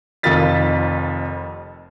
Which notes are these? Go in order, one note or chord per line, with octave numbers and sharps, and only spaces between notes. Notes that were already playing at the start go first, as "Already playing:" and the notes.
F1 F2 D#3 F4 A6 B6